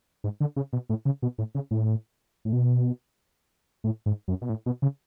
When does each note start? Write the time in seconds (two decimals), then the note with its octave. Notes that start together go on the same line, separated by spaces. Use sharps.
0.24 G#2
0.40 D3
0.56 C#3
0.73 B2
0.89 A2
1.05 C#3
1.22 B2
1.38 A2
1.55 C#3
1.71 A2
2.45 A2
2.53 B2
3.84 A2
4.06 G#2
4.28 F#2
4.42 B2
4.49 A2
4.66 B2
4.82 C#3